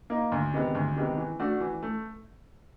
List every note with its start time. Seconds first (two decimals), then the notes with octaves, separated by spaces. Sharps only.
0.10 A#3 D#4
0.32 D2
0.54 C3 D#3 G#3 B3
0.75 D2
0.96 C3 D#3 G#3 B3
1.18 E3
1.39 A3 D4 F#4
1.61 E3
1.83 A3